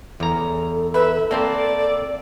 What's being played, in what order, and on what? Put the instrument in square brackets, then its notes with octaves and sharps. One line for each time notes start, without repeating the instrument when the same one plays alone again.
[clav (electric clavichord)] E2 A#5 [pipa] C#3 [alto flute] A4
[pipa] B4 [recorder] E5
[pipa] A3 [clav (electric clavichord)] A#3 C4 C5 [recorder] D5